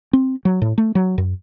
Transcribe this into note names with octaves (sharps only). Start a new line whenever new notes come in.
C4
F#3
A2
A3
F#3
F#2